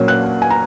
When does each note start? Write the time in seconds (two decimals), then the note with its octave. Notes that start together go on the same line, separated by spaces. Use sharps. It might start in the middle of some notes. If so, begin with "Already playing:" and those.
Already playing: A#2 F#3 A#3 C#4
0.08 F#6
0.42 G#5
0.50 A#5